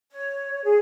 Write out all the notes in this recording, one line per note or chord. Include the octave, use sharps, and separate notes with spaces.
C#5
G#4